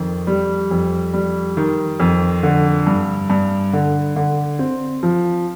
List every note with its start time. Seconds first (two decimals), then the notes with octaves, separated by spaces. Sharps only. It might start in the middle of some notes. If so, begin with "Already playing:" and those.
Already playing: F2 D#3
0.27 G3
0.71 F2
1.13 G3
1.57 D#3
2.00 F2
2.43 D3
2.87 G2
3.30 G2
3.73 D3
4.16 D3
4.59 C4
5.03 F3